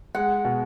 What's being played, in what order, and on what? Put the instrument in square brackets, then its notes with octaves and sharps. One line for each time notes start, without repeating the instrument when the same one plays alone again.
[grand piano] G#3 [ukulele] F#5
[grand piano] B2